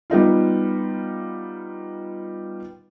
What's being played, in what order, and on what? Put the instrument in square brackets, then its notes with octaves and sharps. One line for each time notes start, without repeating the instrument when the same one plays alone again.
[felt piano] G3 B3 D#4 F4